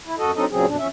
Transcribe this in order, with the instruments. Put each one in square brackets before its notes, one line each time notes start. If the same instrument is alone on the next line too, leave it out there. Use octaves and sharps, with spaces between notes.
[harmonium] E4
F#2 F#4 A4 D#5
F#3 C4 D4 D#4 A4 D#5
A#2 C#3 F#3 C4 G#4
F#2 B2 D4
F2 C#4 E5